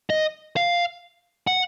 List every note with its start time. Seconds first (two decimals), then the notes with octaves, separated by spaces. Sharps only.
0.10 D#5
0.56 F5
1.47 F#5